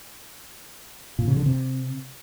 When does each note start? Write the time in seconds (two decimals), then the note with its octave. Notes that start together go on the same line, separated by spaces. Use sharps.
1.19 A#2
1.28 C#3
1.37 D3
1.46 C3